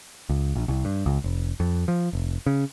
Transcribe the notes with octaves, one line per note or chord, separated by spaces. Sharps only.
C#2
A#1
C2
G2
C#2
F1
F2
F3
F1
C#3